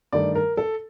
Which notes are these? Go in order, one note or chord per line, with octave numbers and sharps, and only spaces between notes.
G2 D#3 A3 D5
A#4
A4